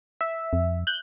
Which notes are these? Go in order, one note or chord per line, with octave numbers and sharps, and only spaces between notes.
E5
F2
F#6 G6